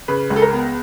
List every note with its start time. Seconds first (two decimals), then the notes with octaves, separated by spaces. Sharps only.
0.08 C#3 B4
0.30 C#2
0.36 A4
0.42 A#4
0.53 B3